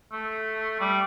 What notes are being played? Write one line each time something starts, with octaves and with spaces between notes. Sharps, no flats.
A3
G3